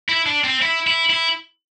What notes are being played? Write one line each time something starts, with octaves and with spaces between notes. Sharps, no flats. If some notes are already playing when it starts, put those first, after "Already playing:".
E4
D4
C4
E4
E4
E4